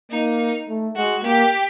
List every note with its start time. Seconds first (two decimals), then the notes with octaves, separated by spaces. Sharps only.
0.11 A#3 D#4
0.68 A3
0.96 G#3 F#4
1.24 A#3 G4